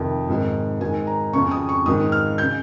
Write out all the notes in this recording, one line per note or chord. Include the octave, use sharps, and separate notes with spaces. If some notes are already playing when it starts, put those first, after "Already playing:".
Already playing: F2 C3 D#3
G#2 D#3
G#2 D#3 G#5
A#5
F2 C#3 C#6
D#6
C#6
G#2 D#3 D#6
F6
G6
C#3